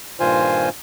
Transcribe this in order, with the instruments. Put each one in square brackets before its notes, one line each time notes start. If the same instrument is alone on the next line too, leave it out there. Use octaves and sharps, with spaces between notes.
[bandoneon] G2 A#2 D#3 F4 C5 G#5